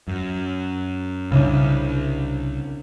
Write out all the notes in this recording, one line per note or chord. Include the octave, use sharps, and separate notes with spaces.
F#2
C2 C#3 D4